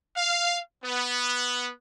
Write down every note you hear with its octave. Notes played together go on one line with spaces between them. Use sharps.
F5
B3